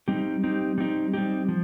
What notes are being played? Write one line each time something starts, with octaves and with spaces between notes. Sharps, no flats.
G3 C4 D#4 G4
G3 C4 D#4 G4
G3 C4 D#4 G4
G3 C4 D#4 G4
F3